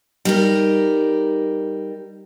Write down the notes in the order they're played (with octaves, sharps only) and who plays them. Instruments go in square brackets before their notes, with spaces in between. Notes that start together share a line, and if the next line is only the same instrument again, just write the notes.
[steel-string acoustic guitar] G3 D#4 A#4